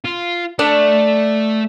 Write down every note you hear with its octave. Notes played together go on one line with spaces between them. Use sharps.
F4
A3 D4